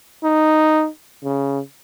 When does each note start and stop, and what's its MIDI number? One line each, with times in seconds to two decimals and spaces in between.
0.24 0.87 63
1.24 1.60 49